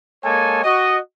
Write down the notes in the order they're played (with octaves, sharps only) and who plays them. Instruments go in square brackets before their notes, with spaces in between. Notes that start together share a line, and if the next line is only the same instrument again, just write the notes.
[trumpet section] G#3 A#3 A4 C#5 G#5
F#4 D#5